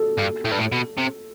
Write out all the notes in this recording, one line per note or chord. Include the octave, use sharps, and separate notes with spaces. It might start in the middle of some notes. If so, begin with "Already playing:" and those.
Already playing: A4
G2
A2
G2
A2
B2
C3